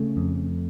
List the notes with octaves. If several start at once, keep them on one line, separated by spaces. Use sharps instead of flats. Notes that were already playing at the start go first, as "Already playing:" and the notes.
Already playing: C#3 A3
F2